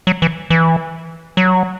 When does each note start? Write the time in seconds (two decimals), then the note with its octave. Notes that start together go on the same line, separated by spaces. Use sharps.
0.07 F#3
0.22 E3
0.50 E3
1.37 F#3